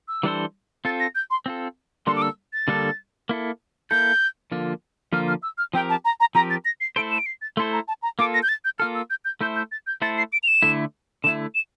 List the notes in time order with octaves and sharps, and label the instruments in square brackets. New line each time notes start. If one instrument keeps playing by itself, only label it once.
[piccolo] E6
[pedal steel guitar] E3 G3 D4 A4 C5
[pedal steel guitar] C4 F4 A4 [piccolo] A6
[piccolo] A#6
G6
C6
[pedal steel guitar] C4 F4 A4
[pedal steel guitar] D3 G3 A#3 D4 A4 [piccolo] C6
[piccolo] D6
E6
A6
[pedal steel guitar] D3 G3 A#3 D4 A4
A#3 E4 A4
[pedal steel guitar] A#3 E4 A4 [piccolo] G6
[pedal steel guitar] D3 F3 A#3 F4
[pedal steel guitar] D3 F3 A#3 F4 [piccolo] F6
[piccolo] F6
E6
F6
[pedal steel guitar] F3 C4 G4 A#4 [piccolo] G5
[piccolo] A5
A#5
A#5
[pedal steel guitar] F3 C4 G4 A#4 [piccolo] A#5
[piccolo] A6
A#6
C7
[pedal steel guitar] A3 E4 A4 C5 [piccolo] D7
[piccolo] E7
D7
C7
A6
[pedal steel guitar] A3 E4 A4 C5 [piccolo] C6
[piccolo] A#5
A5
A#5
[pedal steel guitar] A#3 F4 A4 [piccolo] D6
[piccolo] A#6
G6
A6
G6
[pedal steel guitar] A#3 F4 A4 [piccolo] F6
[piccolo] E6
G6
G6
[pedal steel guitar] A3 E4 A4 C5 [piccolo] G6
[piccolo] G6
A6
G6
[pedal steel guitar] A3 E4 A4 C5 [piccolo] A6
[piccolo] C7
D7
F7
E7
[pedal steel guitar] D3 A3 E4
[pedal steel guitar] D3 A3 E4 [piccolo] E7
[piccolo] E7